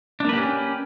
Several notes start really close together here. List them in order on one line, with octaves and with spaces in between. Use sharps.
D4 A#3 B4 G4 C#4